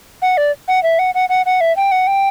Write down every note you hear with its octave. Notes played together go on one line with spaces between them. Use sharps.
F#5
D5
F#5
E5
F#5
F#5
F#5
F#5
E5
G5
F#5
G5